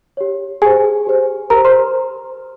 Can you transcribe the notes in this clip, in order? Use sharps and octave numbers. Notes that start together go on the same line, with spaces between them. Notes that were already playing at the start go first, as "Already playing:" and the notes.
G4 C#5
G4 G#4 C5 G#5
G4 C5
G4 A#4 C5 A#5
C5 C6